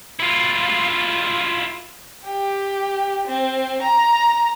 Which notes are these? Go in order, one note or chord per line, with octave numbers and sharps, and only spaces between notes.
E4 F4
G4
C4
A#5